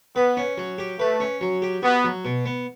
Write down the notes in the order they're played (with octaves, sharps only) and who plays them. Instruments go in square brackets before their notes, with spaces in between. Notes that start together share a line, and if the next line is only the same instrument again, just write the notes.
[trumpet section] B3 [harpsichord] B4
[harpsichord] C#4
F#3
G4
[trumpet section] A3 [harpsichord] B4
[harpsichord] C#4
F#3
G4
[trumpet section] B3 [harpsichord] F#4
[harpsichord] F#3
B2
B3